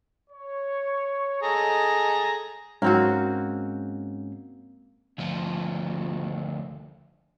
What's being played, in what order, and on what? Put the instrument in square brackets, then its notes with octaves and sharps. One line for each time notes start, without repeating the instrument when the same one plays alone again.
[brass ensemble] C#5
[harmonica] G#4 A#5 [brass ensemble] A4 D#5
[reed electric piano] G#2 G#3 C#4 [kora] A#3 C4 F#4
[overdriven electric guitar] D2 F3